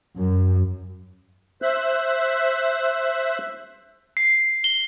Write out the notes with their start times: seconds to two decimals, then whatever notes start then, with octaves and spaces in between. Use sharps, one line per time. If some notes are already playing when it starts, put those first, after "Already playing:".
0.16 F#2
1.62 C5 E5 F#6
4.17 C7
4.64 G7